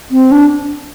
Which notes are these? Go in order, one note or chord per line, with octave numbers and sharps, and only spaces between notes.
C4
D4